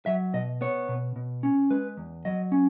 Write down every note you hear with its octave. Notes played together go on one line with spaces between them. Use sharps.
F#3 E5
B2 D#5
B3 C#5
B2
B2
C#4
G#3 B4
E2
F#3 D#5
C#4